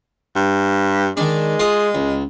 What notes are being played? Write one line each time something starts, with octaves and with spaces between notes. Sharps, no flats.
G2
D#3 G#3 D4
F4 G#4 D#5
C#2